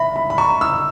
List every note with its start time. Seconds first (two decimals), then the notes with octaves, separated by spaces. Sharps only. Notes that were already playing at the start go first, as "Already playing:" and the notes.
Already playing: E5 B5
0.16 B5
0.30 B5
0.38 A#5 C#6
0.61 E6